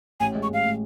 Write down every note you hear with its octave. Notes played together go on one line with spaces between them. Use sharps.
A1 G#5
G#3
C#6
A1 F5
A2